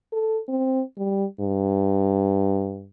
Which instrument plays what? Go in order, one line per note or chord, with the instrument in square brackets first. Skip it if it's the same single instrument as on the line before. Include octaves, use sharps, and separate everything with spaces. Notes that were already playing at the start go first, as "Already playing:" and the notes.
[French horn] A4
C4
G3
G2